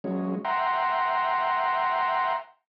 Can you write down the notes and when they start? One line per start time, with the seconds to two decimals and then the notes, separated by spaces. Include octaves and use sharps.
0.04 F#3 G#3 C#4
0.45 E5 F#5 G5 A#5 C6